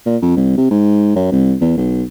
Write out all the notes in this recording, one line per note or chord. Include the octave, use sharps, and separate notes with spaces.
A#2
F2
C2
C3
G#2
F#2
C2
E2
B1